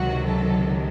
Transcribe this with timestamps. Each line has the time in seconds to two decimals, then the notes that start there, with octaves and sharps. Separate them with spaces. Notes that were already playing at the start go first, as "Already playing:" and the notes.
Already playing: C#2 C3 D#3 F#3 F#4
0.27 A4